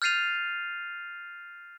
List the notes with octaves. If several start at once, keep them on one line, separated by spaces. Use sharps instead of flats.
F6 G6 A6 C7 D#7 F7